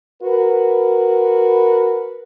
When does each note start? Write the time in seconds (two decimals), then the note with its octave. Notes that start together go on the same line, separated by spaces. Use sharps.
0.22 F#4 A#4 B4